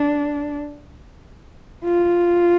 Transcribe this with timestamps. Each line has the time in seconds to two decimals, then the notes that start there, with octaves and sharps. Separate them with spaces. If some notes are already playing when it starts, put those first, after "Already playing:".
Already playing: D4
1.84 F4